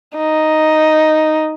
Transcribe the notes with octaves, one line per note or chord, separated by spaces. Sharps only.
D#4